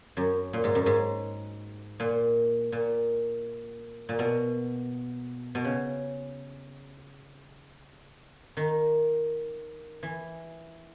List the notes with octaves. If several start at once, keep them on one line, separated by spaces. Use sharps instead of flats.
F#2
A#2
G#2
F#2
G#2
A#2
A#2
A#2
B2
B2
C#3
D#3
E3